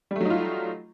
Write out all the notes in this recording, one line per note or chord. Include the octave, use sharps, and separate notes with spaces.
F#3 G3 A3 D#4 F4